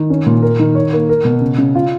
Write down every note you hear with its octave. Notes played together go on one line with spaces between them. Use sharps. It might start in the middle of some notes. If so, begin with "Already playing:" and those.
Already playing: D#3
C#4
A#2
A#4
D#3
C#5
A#3
A#4
B2
C#3
C#3
F4